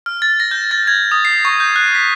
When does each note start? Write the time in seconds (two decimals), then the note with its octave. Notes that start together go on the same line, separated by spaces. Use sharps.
0.06 F6
0.22 A6
0.40 A#6
0.51 G6
0.71 A6
0.87 G#6
1.12 D#6
1.25 C7
1.45 C#6
1.60 G6
1.76 F#6
1.95 B6